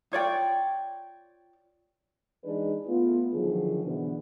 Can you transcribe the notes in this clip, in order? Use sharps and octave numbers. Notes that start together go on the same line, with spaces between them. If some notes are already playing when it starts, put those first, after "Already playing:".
F4 C#5 D5 G5
E3 G#3 D4 D#4 G#4 B4
A3 B3 F4
D3 D#3 F3 F#3 D4 G#4
B2 D3 E3 B3 D4 E4